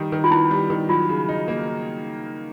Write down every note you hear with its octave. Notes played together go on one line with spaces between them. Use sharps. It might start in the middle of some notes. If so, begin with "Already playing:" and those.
Already playing: D#3 G3
D#3
F4
B3 E4
G3
D#3
F#3 F4
C#3
D#4
A#3